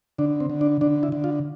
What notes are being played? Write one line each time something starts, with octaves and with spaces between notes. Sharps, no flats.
D3 D4
C4
D3
D4
D3 D4
E4
D3
F4